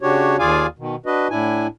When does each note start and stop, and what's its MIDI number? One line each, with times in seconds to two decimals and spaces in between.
0.01 0.36 49
0.01 0.36 62
0.01 0.36 66
0.01 0.36 67
0.01 0.36 73
0.39 0.67 39
0.39 0.67 65
0.39 0.67 68
0.39 0.67 74
0.39 0.67 77
0.39 0.67 80
0.79 0.95 47
0.79 0.95 51
1.06 1.28 62
1.06 1.28 66
1.06 1.28 71
1.06 1.28 75
1.30 1.67 45
1.30 1.67 62
1.30 1.67 64
1.30 1.67 80